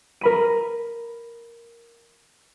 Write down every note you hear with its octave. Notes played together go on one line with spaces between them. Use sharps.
A#4 B5 D#7